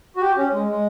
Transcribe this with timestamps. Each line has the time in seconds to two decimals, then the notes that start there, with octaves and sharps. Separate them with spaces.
0.16 F#4
0.22 G4
0.37 C#4
0.53 G#3
0.68 G#3